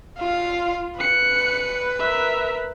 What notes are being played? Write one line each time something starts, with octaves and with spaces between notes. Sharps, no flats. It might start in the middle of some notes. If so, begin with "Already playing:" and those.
F4 F5
B4 F#6 C#7
A#4 E5